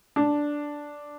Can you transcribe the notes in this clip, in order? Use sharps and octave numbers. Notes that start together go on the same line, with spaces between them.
D4